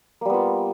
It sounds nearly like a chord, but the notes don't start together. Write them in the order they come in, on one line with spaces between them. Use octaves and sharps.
A#3 G3 B3 F4